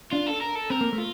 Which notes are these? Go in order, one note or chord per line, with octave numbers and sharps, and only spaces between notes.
D4 F4
A4
A#4
A4
C4 A#4
A#3
A3
F4